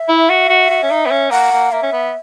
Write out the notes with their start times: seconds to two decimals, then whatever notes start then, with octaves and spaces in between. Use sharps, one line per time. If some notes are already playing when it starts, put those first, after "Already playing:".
Already playing: E5
0.09 E4
0.29 F#4
0.49 F#4
0.70 F#4
0.83 C#4
0.91 D#4
1.06 B3
1.11 C#4
1.31 A#3 F#5
1.52 A#3
1.72 A#3 E5
1.83 C#4
1.93 B3